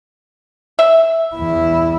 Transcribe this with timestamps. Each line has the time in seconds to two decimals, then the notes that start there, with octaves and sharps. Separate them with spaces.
0.79 E5
1.35 E2 E4